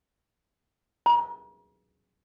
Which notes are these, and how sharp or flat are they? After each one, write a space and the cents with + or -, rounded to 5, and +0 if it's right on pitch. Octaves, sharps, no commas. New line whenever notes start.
A#5 +40